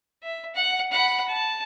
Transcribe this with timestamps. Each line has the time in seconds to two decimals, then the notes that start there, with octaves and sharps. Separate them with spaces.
0.23 E5
0.55 F#5
0.92 F#5 B5
1.28 A5